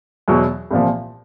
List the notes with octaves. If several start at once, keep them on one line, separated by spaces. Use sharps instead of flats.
E2 B2 F#3
C2 A#2 F3